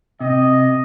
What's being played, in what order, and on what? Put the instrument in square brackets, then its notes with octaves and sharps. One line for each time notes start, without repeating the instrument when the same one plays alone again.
[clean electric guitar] C3 [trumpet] D#5